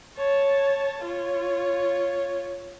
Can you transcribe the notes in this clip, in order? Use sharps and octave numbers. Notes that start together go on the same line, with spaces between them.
C#5 A5
F4 C#5